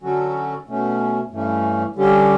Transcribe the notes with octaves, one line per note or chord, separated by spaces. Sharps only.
D3 F#3 C#4 F#4 A4
B2 A3 C#4
G2 E3 A3 C#4
D3 G3 C#4 G4